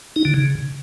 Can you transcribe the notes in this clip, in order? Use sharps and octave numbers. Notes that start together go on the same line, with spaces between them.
D#4
D3
C#3